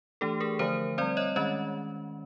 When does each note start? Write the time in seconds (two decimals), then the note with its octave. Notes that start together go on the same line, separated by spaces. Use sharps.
0.21 E3 A3 D4 G4 A4
0.40 G#4 A#4
0.59 D3 F3 A3 A#4 C5
0.98 G3 C4 C5 D5
1.17 C#5 D#5
1.36 D#3 G#3 C#4 C#5 D#5